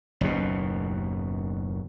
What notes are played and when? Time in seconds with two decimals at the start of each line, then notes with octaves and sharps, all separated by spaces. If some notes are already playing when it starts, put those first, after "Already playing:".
0.21 F#1 D#2 B2